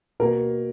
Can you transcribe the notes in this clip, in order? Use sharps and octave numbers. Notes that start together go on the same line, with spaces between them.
B2 A#3 A#4